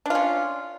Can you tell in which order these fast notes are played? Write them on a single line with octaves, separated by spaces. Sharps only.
D4 F4 C#4